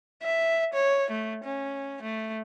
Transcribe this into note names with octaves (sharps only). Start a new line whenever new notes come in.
E5
C#5
A3
C#4
A3